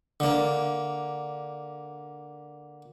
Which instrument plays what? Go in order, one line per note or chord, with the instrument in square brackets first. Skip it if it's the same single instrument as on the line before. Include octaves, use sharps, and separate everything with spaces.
[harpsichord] D3 A#3